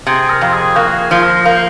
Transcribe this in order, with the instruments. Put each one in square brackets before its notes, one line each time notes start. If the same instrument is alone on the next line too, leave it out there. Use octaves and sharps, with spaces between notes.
[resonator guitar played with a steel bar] C3 [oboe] G#4
[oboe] A#4
[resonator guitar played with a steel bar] F2
[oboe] G#4
[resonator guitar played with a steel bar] A#3 [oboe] F#4
[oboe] G#4
[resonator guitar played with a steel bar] F3
[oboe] A#4
[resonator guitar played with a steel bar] A#3 [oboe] C5